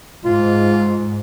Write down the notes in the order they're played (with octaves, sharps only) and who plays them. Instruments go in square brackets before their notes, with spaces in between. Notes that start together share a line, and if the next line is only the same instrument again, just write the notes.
[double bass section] G#2 [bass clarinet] F4